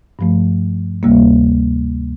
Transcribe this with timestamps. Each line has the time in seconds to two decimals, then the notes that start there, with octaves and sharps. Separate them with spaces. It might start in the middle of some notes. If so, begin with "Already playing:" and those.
0.19 G2 F3 A3
1.03 D2 C3 G3 A#3